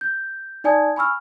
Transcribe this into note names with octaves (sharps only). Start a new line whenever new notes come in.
G6
D#4 D5 G#5 A5 D#6 G#6
G#5 B5 C#6 E6 F6